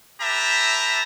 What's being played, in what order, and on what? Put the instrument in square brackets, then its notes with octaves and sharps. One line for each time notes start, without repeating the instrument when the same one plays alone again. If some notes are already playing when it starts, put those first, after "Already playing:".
[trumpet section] G4 B4 E5 A5 A#5